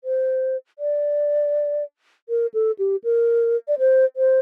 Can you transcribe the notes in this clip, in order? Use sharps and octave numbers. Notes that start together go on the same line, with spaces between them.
C5
D5
A#4
A4
G4
A#4
D5
C5
C5